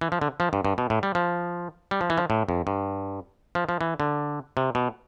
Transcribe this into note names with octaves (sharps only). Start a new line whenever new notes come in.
E3
F3
D3
F3
G2
G2
B2
A2
G3
F3
G3
F3
E3
F3
A2
F2
G2
F3
F3
E3
D3
C3
B2